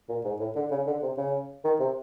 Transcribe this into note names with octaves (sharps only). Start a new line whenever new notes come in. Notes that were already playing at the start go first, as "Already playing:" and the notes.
A#2
G#2
A2
D3
C#3
D3
C3
C#3
D#3
C3